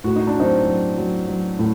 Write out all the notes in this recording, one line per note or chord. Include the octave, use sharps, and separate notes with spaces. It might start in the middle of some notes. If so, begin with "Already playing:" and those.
A2 F#4
D#4
D4
F#3 C4 D#4
F#3
F#3
F#3
A2